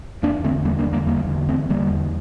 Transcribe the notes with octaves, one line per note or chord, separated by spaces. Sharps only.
E2 A#3 D4
D3 A3 C4
E2 G3 A#3
A#3 D4
D3
G3 A#3
E2 G3 A#3
D3
E2 A3 C4
D3 G3 A#3
E2